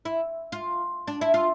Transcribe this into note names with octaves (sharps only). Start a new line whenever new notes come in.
E4
F4
D4
E4
F4